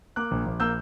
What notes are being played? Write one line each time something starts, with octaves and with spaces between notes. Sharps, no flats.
A#3 D6 F#6
A#1
A#1
A#3 E6 G6